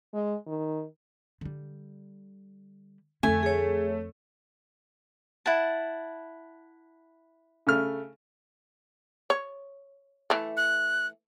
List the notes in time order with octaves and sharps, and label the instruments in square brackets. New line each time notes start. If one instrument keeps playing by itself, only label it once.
[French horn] G#3
D#3
[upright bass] D3 G3
[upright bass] F2 D3 [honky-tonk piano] A3 [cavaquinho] G#5
[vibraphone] G#4 C#5
[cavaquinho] E4 F#5 A5
[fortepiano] C#3 A3 F6
[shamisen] C#5
E3 A3
[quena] F#6